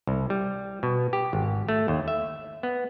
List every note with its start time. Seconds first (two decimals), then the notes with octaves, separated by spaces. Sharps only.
0.07 C2
0.30 G3
0.83 B2
1.13 G4
1.33 G#1
1.69 A3
1.88 D#2
2.08 E5
2.63 B3